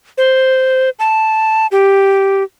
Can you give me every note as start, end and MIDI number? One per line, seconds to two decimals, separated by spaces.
0.18 0.90 72
0.99 1.67 81
1.72 2.43 67